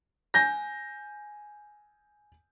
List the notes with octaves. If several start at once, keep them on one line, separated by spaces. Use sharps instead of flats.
G#5 G6 A#6